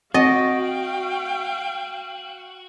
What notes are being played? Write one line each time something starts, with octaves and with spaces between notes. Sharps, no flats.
C4 F#4 D#5 F5 G5